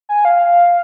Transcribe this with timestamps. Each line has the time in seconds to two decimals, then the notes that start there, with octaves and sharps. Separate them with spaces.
0.09 G#5
0.25 F5